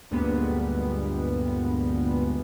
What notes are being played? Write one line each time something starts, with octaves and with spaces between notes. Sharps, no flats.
D2 G2 A#2 G3 G#3 B3